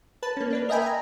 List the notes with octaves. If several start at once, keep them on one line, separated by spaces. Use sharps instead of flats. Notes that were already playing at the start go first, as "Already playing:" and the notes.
B4 A5
A#3 C#4
A#3 D4 B4
A#4 D#5 E5 G5 G#5 B5
G#5 A#5